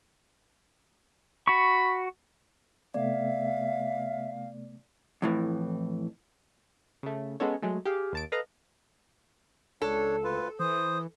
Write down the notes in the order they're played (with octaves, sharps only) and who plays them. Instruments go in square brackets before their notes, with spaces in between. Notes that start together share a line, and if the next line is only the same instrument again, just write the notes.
[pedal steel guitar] F#4 C#6 [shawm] B5
[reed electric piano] C3 A3 B3 [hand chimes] D5 [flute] E5 [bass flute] F5
[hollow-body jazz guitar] F2 A2 E3
[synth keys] C#3 A3
G#3 B3 C#4 A4 C#5
F#3 G#3 A3
G4 G#4 F5
D#2 A5 D7
A4 B4 D#5 F5 A#5
[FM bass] C#2 [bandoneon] D4 C#5 [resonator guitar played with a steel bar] A4
[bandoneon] D2 F4 B4
[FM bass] E3 [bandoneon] C5 [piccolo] D#6